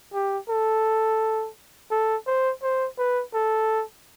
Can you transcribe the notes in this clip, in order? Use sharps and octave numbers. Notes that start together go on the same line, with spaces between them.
G4
A4
A4
C5
C5
B4
A4